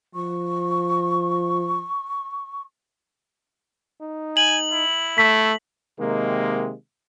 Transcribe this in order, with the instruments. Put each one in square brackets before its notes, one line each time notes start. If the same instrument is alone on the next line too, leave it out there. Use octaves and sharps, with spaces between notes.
[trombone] F3 [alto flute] C#6
[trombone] D#4
[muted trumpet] G#5 [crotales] F#7
[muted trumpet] E4
[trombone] A3 [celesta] B6
[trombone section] C3 D#3 G#3 A#3